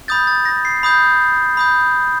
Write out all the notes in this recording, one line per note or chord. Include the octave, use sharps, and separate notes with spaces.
B5 D#6 G6 A6
A6
A#6
C7
B5 D#6 G6
B5 D#6 G6